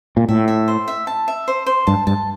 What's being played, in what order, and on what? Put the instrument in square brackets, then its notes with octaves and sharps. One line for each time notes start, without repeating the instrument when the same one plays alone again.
[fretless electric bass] A#2
[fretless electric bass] A2 [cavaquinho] E5
[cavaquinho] E5
C5
E5
A5
E5
C5
C5
[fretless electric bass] G2 [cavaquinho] A5
[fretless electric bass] G2 [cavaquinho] A5